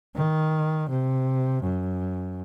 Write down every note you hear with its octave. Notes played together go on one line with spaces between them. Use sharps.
D#3
C3
F#2